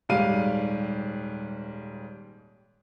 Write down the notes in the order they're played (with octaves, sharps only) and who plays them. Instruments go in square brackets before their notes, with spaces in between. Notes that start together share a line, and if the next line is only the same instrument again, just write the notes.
[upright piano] D#1 G#2 G3 F5 D#7